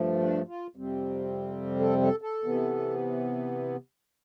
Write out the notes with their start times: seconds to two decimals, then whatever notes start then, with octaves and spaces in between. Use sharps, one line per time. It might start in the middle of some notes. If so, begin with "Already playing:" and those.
Already playing: G2 F3 A3
0.20 D4
0.47 F4
0.76 F2 C3 G3 C4
1.80 A4
2.01 A4
2.22 A4
2.44 C3 E3 B3